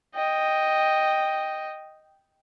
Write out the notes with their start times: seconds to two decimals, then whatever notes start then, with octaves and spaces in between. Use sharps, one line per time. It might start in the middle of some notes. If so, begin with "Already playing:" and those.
0.15 D#5 G5